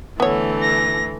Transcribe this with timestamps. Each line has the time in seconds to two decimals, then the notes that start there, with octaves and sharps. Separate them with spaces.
0.20 D3 E3 A3 B3 A4 C#5
0.62 A#6